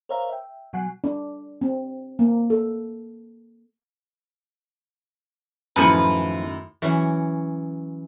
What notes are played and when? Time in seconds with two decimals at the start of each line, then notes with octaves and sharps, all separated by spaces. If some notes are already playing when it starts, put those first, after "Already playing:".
0.09 A#4 C5 C#5 E5 F5 A#5
0.29 E5 G5
0.73 B2 F#3 F#5 G#5 F#6 C7
1.04 D4
1.61 C4
2.19 A#3
2.50 A4
5.76 F#2 A2 D#3 F3 B4 F#5 G#5
6.82 E3 F#3 C#4